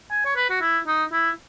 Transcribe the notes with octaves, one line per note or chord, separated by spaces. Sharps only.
G#5
C#5
B4
F#4
E4
D#4
E4